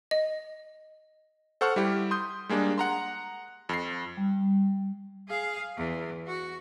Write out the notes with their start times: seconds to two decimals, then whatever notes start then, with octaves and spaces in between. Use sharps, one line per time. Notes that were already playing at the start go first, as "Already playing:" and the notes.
0.11 D#5
1.61 A4 C5 F#5 C#6 F6
1.76 G3 E4 G4
2.11 C6 D#6 G6
2.49 G3 G#3 A#3 D4
2.78 F#5 A#5 C6
3.69 F2 C7
4.17 G3
5.29 G#4 F5
5.77 E2
6.27 F#4